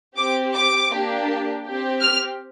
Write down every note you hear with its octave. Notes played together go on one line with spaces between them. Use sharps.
C4 G4 D6
D6
A#3 D4 G4
C4 G4
F6